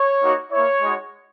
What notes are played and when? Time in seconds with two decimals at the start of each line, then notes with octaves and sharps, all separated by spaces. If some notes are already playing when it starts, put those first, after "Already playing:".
Already playing: C#5
0.21 A#3 D#4 F#4
0.51 A#3 E4 C#5
0.81 G#3 D#4 F#4